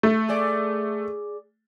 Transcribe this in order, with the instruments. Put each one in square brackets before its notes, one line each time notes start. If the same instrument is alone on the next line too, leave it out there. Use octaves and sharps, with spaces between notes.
[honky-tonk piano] A3
[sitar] G#4 D5